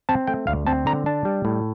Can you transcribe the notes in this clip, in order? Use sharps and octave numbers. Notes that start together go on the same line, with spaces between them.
C4 A5
A3 G5
D2 F5
C4 A5
D3 A#5
D4 A5
G3
A2